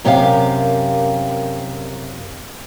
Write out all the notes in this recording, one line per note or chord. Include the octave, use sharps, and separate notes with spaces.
F#2 C3 G4 A#4 F5